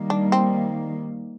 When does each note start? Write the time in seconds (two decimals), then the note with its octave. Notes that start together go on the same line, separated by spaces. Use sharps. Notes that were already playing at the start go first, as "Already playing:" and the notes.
Already playing: D#3 G3 A#3
0.10 D4
0.32 C4